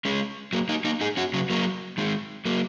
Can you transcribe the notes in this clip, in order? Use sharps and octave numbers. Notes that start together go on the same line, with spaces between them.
G#3 C#4
F#3 A#3
A#3 D#4
A#3 D#4
D#4 G#4
C#4 F#4
C#3 F#3
F#3 A#3
D#3 G#3
F#3 A#3